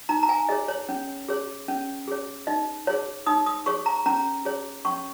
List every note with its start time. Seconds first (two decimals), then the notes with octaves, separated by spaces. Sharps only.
0.09 D#4 A#5
0.23 A#5
0.29 G#5
0.49 G#4 C#5 D#5
0.68 C#5
0.89 C#4
1.29 G#4 C#5
1.68 C#4
2.08 G#4 C#5
2.47 D#4 D#5
2.87 G#4 C#5
3.26 D#4 D#6
3.46 D#6
3.66 G#4 C#5 C#6
3.86 A#5
4.06 C#4 A#5
4.45 G#4 C#5
4.85 C#4 C#6